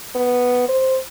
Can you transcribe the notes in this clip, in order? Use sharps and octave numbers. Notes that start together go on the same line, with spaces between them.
B3
C5